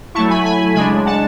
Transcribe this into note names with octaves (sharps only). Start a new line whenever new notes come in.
F#3 A3 E4 A5 C#6
G#5 B5
G#5 B5
C#3 G#3 D4 G#5 B5
F#5 A5